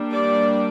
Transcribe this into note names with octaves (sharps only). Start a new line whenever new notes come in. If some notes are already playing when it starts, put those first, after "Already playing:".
Already playing: G3 A#3 D4
D5